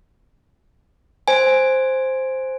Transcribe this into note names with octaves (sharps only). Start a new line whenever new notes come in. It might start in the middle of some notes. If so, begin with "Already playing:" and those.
C5 G#5